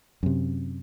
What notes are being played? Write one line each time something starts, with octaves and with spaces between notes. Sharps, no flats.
F#2 C3